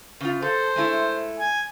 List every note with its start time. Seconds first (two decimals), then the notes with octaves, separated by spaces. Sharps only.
0.21 C#3 F4
0.42 A4 C5
0.76 G#3 A3 E4
1.39 G#5